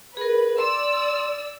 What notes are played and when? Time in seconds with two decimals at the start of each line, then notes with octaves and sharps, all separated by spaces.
0.17 G#4 A#4 B4
0.58 D5 C6 E6